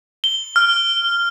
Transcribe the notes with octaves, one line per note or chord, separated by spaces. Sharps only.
G7
F6